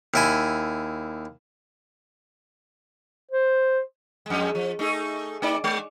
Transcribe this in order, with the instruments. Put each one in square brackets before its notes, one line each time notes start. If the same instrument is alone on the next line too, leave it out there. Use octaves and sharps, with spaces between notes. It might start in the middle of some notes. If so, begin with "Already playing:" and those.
[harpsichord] D#2 E4 G#5
[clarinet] C5
[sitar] F2 G#3
F3
A3 D#4 G#4
A3 D#4 D5
G#3